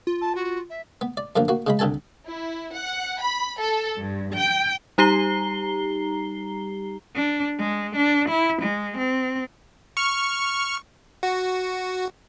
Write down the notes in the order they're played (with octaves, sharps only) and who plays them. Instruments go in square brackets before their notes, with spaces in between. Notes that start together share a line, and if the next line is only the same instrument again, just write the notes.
[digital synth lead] F4
[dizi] A5
F#4
E5
[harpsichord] B3
D5
F#2 D3 F3 A#3
A#3 F#4
C#3 G#3 B5
C2 D3 A4 G#5 A5
[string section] E4
F#5
B5
A4
G2
G5
[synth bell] G3 D#4 G4 A#5 C7 G7
[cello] D4
G#3
D4
E4
G#3
C4
[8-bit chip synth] C#6 F6
F#4